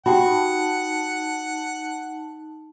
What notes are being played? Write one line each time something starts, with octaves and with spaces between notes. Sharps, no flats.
D#4 F#4 G4 F#5 G5 A5 B5